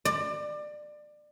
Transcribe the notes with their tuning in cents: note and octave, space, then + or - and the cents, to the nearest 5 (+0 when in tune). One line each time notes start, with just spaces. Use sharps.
D5 +25